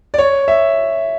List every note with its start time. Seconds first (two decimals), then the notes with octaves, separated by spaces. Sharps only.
0.14 D5
0.18 C#5
0.48 E5